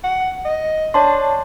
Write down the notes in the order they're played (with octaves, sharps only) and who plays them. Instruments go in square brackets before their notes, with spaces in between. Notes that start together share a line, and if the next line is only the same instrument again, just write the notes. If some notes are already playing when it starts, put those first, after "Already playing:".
[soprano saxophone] F#5
D#5
[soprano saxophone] D4 [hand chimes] C#5 A5 C6